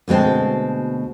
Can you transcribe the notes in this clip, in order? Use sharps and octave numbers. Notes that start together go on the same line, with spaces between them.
D2 B2 G#3 C4 A5